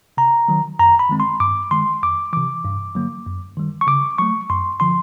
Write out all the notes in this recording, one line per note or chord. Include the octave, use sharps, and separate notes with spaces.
C3 A#5
D#3 F#3
F#2 A#5
B5
D#3 G#3 C4
C6
G2 D6
D#3 G#3 C6
F2 D6
C3 E3 D6
G2
D3 F#3 A#3
F#2
D#3 G3
C#6
C#3 D6
F#3 A3 C#6
F#2 C6
D3 F3 C6